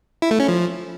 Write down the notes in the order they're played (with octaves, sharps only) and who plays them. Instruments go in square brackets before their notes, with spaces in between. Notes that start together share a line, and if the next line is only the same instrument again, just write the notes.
[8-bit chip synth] E4
A3
C#4
F3